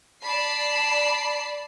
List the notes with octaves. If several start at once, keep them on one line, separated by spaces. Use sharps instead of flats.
D5 A5 B5 C7